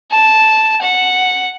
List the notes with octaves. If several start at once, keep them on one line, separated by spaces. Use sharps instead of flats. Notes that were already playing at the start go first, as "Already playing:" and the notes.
A5
F#5